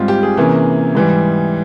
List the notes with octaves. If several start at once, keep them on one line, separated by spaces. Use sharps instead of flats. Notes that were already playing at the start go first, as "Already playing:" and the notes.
Already playing: G#2 G3 C4 F4
G4
G#4
C3 E3 A#3 C#4
G#2 E3 G3